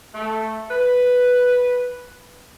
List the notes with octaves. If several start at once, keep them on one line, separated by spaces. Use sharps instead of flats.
A3
B4